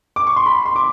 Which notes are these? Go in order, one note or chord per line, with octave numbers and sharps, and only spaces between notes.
D6
C#6
C6
B5
C6
D6